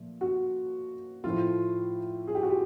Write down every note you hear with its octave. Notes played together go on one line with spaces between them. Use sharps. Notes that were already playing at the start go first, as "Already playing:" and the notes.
Already playing: A#2 F3 A3
F#4
A2 F3 A3 F4
G#4
G4
F#4
G4